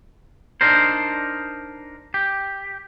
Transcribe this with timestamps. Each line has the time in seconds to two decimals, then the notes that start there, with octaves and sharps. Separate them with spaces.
0.61 D4 D#4 A#4 C5
2.14 G4